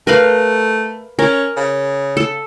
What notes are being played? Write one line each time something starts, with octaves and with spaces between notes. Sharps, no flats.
A3 A#4 B4 F5
C#4 A#4
C#3
A4